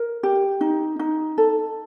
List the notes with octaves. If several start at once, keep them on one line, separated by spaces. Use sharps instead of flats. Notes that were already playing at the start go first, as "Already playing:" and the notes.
Already playing: A#4
G4
D#4
D#4
A4